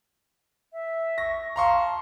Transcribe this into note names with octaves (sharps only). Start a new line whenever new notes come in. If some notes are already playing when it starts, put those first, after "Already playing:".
E5
C#6 A#6
F5 A5 A#5 C6 C#6